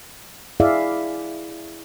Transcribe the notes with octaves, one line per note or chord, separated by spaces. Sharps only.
E4 G#4 D5 E5 F5